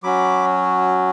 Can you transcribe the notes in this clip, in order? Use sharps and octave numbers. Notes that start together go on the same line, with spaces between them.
F#3 C#4 F#4 B5 D6